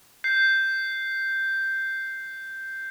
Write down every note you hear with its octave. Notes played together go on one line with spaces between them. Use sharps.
G6 C7